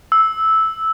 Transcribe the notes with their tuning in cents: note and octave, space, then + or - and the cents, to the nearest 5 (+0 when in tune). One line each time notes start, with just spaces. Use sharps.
E6 -10